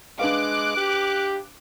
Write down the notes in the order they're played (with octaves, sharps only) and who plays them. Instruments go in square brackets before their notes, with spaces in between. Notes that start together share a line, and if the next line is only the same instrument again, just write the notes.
[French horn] G#3 [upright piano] D4 B4 F5 [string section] D6 F#6
[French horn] G4